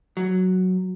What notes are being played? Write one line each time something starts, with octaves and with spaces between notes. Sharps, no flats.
F#3